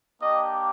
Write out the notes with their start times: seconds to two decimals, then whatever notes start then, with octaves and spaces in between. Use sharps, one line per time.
0.22 A#3 D4 G4 D#5